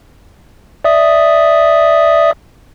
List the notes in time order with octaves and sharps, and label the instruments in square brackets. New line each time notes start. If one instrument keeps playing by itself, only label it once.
[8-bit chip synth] D5 E5 D#6